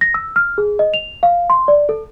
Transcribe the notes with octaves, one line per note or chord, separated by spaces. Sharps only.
A#6
E6
F6
G#4
D#5
F7
F5
C6
D5
A4